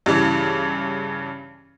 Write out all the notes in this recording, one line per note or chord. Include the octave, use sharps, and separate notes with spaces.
G2 C#3 E3